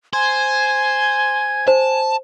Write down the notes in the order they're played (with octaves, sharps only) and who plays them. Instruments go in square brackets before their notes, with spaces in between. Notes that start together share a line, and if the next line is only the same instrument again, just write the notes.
[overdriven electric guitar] C5 [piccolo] G#5 [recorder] G#6
[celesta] C5 [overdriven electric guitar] A5